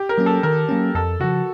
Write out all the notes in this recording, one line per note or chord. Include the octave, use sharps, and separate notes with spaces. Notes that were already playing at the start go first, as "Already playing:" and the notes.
Already playing: G4
A#4
F#3 A#3 C#4
A4
D#3 A#4
F#3 A#3 C#4
F2 A4
C#3 F3 F#4